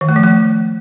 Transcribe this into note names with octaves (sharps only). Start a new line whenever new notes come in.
D#3
A3
F3
A3